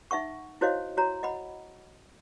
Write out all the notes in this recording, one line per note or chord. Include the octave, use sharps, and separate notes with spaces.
D#4 E5 F#5 C#6
E4 F#4 C5 C#5 D#5 F5
F#4 C#5 A#5
D#5 F#5 B5